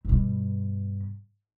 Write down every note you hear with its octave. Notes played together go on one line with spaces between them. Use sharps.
G2 B2